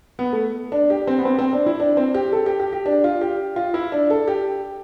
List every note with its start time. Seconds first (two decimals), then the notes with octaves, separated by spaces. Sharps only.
0.19 B3
0.33 A3
0.72 D4
0.90 G4
1.07 C4
1.19 B3
1.25 C4
1.39 C4
1.53 D4
1.66 E4
1.80 D4
1.97 C4
2.14 G4
2.32 A4
2.46 G4
2.60 G4
2.73 G4
2.86 D4
3.04 F4
3.21 G4
3.56 F4
3.74 E4
3.92 D4
4.10 A4
4.27 G4